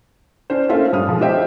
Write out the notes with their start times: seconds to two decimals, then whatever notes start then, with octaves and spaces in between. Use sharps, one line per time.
0.50 C#4 D4 C5
0.69 A3 A#3 C#4 F4 C5 E5
0.92 G2 G3 D#6 F6
1.07 B2 F3 G#3
1.21 F4 G4 C5 D#5 E5 G5